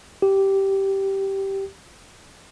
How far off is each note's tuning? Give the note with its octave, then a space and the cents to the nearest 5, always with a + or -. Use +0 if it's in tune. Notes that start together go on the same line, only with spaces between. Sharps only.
G4 -10